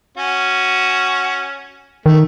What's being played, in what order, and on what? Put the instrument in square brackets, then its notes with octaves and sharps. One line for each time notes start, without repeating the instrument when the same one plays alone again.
[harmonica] C#4 F#4
[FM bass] D#3 [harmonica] A3